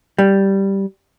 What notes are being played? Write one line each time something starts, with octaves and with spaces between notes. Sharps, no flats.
G3